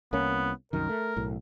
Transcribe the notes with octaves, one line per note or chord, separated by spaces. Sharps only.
C2 A#3 B3 C#4
C2 F#2 D#3 A#4
A3
B1 A2